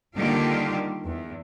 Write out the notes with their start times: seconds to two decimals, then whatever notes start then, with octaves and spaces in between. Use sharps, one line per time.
0.16 D3 D#3 G3 A#3 F4 G4
1.05 E2